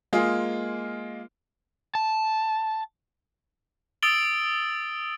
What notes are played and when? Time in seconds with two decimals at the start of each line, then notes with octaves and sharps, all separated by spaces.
0.13 G#3 A#3 F4 G#4
1.95 A5
4.02 D#6 E6 A6 D7 F#7 G7